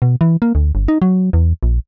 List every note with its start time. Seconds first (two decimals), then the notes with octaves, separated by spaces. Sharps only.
0.02 B2
0.21 E3
0.42 A#3
0.55 D2
0.75 G1
0.88 D#4
1.02 F#3
1.33 E2
1.63 A#1